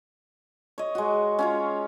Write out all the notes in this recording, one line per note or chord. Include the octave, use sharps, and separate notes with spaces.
C#5 D#5
G#3 F#4
C#4 F4 C#5